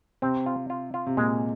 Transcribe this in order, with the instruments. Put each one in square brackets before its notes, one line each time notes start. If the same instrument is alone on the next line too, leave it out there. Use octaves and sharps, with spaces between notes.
[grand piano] C3 [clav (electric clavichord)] C4
[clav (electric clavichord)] F4
F4
F4
[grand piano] C3
[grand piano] A#2 [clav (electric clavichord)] G#3